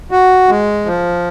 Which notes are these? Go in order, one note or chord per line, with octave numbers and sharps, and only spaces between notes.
F#4
G#3
F3